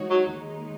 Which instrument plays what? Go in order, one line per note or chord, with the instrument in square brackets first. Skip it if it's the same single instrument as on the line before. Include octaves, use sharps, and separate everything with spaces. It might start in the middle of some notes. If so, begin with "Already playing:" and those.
Already playing: [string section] E3 G#3 D#4 F#4 C#5
[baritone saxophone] F#3
[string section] D#2 D#3 G#3 D#4